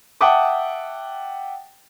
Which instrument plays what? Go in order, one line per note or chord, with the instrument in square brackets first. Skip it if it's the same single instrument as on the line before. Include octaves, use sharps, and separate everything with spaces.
[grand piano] E5 F#5 G5 A5 D6 D#6